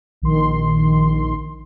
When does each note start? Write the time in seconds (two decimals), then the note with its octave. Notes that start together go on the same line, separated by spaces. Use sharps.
0.22 A#1 D#3 C6